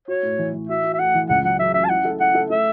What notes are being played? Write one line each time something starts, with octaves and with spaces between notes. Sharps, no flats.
F#4 C#5
A2
E3
E3
F#4 E5
F#4
E5
A3 F#5
E3
C#2 F#5
F#3 F#5
F#3 E5
C#4 E5
A5
E4 F#5
A4
E4 F#5
A4
A3 E5